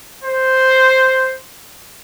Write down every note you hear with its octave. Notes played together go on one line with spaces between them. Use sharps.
C5